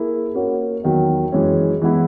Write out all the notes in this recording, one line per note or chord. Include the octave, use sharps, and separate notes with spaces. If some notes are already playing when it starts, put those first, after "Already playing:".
Already playing: A#3 E4 G#4
A#3 C#4 F#4
E2 D#3 F#3
F#2 E3 G#3 C#4
E3 G#3 B3 E4